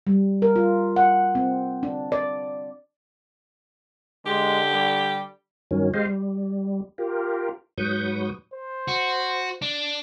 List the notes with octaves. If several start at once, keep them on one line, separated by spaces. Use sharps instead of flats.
G3
A#4
F4
F#5
C4
D4
D5
D3 G#3 G4
G3
G2 D#3 F#3 C#4
G#3 G4 C5 D#5 F5
G3
F4 G4 A#4
G#2 F#3 B4 C#6 D#6 G6
C5
F#4
D4